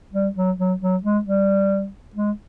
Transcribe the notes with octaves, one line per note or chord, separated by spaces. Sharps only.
G3
F#3
F#3
F#3
G#3
G3
G#3